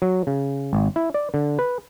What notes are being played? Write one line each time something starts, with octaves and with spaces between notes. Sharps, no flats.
F#3
C#3
G#1
E4
D5
D3
B4